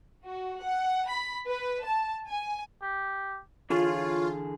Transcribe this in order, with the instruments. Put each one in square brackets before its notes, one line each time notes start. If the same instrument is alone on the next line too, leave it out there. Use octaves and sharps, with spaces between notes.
[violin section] F#4
F#5
B5
B4
A5
G#5
[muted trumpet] G4
[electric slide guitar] D3 E3 G#4 [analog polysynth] F4 [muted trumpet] C#5